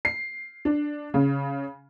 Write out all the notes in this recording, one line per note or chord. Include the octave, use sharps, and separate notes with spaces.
C7
D4
C#3